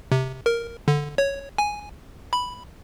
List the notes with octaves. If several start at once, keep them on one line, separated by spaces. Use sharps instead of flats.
C3
A#4
D3
C#5
G#5
B5